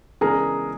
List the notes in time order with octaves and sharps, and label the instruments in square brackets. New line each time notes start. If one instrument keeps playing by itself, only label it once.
[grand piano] C#3 E3 G#3 B3 D4 [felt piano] G#4 A#4